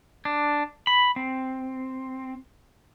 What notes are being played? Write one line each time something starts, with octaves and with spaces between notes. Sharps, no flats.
D4
B5
C4